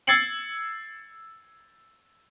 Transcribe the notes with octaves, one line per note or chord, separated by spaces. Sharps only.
E6 G#6 A6 C7 C#7 F#7